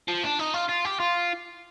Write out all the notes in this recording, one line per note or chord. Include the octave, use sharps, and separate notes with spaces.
F3
D4
D#4
F4
F4
G4
F4